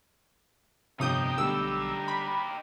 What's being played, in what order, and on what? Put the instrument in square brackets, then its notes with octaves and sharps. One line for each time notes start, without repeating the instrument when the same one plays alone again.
[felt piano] G1 F2 [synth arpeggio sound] C3 D#6 G6 [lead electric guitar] D#4 G4
[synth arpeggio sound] B1 E6 [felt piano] D3 G3 A3
[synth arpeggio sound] B5